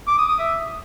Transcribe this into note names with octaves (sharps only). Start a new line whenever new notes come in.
D6
D#6
D#6
E5